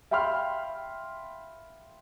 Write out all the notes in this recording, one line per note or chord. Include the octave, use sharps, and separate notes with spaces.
E5 F5 G5 B5 C6 F6